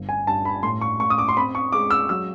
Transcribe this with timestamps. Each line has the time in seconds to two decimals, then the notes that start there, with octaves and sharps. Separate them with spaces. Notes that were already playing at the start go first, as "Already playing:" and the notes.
Already playing: G1
0.09 G#5
0.27 G2 A5
0.45 B5
0.63 A2 C6
0.81 C#6
1.00 A2 C#6
1.10 D#6
1.18 D6
1.28 C6
1.36 C4 B5
1.55 C#6
1.72 G#3 D6
1.91 E6
2.09 F#3 E6